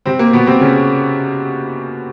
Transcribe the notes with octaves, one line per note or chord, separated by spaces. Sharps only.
C3 C4
A#3
B2 B3
C3 C4
C#3 C#4